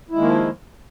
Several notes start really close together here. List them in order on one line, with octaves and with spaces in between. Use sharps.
E4 G#3 D#3 A#3 F3